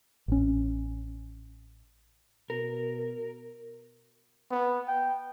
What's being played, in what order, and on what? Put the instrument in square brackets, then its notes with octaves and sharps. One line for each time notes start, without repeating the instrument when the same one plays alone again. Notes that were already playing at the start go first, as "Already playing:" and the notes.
[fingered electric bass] A1 C#4
[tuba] B2 [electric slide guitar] A#4
[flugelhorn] B3
G5